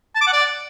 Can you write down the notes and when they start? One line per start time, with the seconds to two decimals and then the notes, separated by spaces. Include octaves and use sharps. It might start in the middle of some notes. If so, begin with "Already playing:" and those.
0.15 A5
0.21 D6
0.27 F#5
0.33 D5